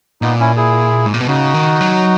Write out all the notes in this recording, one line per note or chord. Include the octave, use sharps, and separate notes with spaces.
A#2 B3 D#4
C#4 E4
E4 G#4
G#2
A#2
B2
C#3 D#4 F#4
D#3
F#3